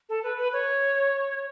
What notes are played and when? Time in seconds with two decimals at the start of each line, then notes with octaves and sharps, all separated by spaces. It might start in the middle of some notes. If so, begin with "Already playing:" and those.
0.09 A4
0.23 B4
0.38 B4
0.53 C#5